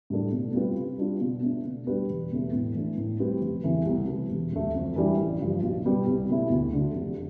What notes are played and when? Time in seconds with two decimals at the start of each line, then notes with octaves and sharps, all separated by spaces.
0.10 A2 G3 D4 A4
0.32 B2
0.54 G3 C4 F4 B4
0.77 C3
0.98 G3 D4 F4
1.21 B2
1.42 A3 D4
1.65 B2
1.87 G3 D4 G4 B4
2.09 E1
2.31 E2 B2 A3
2.53 A2
2.74 E3 B3 D4
2.98 A2
3.19 G3 C4 G4 B4
3.42 F1
3.63 E2 C3 E3 A3
3.85 C2
4.07 C3 G3 B3
4.30 E1
4.52 D2 D3 A3
4.74 F2
4.96 E3 G3 D4
5.18 A1
5.41 G2 F3
5.63 B1
5.85 B2 G3 B3
6.07 C2
6.29 B2 A3 E4
6.50 D2
6.73 D3 A3
6.94 F1